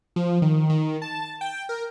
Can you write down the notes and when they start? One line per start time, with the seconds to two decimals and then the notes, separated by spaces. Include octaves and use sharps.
0.16 F3
0.42 D#3
0.70 D#3
1.02 A5
1.41 G5
1.69 A#4